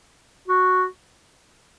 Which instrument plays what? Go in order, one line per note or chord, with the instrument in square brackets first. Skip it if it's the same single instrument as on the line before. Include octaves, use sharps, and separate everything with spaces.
[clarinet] F#4